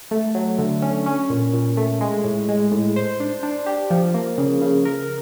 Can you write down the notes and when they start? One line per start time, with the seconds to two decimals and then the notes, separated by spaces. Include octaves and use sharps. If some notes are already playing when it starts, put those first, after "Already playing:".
0.11 A3
0.35 F#3
0.59 D3
0.82 C#4
1.06 C#4
1.30 A#2
1.53 A#2
1.77 A3
2.01 G#3
2.24 A2
2.49 G#3
2.72 A2
2.96 C5
3.20 D4
3.43 D4
3.66 G4
3.90 F3
4.14 A#3
4.38 C#3
4.61 C#3
4.85 A#4